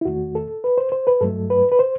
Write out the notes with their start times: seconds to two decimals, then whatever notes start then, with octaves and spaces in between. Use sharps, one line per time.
0.01 E4
0.05 E2 D#3 A3 F#4
0.35 A4
0.64 B4
0.78 C5
0.92 C5
1.07 B4
1.21 G2 F#3 A3 A4
1.50 B4
1.72 B4
1.79 C5